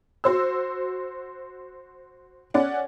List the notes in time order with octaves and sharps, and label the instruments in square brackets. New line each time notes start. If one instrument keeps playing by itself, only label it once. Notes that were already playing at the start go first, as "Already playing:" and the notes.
[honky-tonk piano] F#4 C5 E6
C#4 D5 F#5